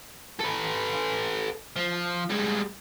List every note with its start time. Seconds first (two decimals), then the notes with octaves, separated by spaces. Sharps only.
0.40 A4 B4
1.76 F3
2.30 G3 G#3